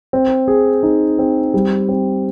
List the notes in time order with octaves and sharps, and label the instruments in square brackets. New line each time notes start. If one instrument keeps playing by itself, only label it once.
[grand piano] C4
G#4
D#4
C4
G3
C4